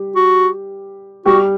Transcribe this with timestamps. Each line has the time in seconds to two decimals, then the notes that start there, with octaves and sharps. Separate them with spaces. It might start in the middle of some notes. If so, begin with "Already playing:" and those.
Already playing: G3 G4
0.16 F#4
1.26 G3 F#4 G4